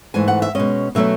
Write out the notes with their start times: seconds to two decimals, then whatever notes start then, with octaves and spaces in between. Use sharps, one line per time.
0.14 G#2 E3 A3 G#5
0.28 F#5
0.42 E5
0.55 B2 G#3 C#4 D#5
0.95 B2 F#3 A3 C#4 E5